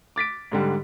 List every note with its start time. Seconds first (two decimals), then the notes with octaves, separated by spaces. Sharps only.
0.16 D6 A6 B6 D7
0.52 G#2 D3 G3